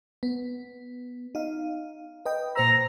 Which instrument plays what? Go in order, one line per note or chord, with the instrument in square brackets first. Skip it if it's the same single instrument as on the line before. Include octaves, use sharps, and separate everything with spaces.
[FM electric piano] B3
D#4 F5
B4 D#5 G5
[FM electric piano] A#2 C5 E6 [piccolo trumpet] A#5